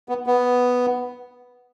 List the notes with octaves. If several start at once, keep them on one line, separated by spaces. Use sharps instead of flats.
B3
B3